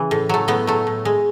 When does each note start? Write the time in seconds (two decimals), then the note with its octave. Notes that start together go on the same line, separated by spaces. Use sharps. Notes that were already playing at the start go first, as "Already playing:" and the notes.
Already playing: C#3 E3
0.11 A2
0.29 F#3 A3
0.48 A2 B3
0.67 F#3 A3
0.87 A2
1.05 G#3